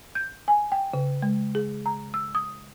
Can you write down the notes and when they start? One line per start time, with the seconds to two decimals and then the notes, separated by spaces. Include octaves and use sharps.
0.15 G6
0.48 G#5
0.72 G5
0.94 C#3
1.22 G#3
1.55 G#4
1.86 A#5
2.14 E6
2.35 D#6